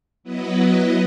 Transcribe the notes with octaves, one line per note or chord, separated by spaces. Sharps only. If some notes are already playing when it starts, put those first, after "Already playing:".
F#3 B3 E4 B4 D#5